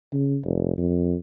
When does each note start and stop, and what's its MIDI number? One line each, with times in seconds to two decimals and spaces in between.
0.13 0.38 49
0.44 0.77 29
0.78 1.16 41